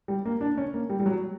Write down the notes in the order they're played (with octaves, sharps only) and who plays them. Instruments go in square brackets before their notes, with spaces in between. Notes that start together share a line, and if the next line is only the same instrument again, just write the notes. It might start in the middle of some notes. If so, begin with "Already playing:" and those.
[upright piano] G3
A#3
D4
C#4
A#3
G3
G3
F#3